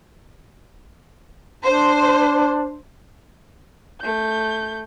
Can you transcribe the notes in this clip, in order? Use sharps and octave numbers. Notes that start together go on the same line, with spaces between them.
D4 C5
A3 G6